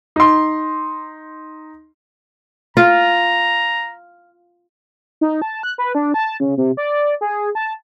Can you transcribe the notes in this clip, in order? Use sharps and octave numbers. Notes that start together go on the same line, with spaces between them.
D#4 C6
F4 A#5
D#4
A5
F#6
B4
D4
A5
C#3
C3
D5
G#4
A5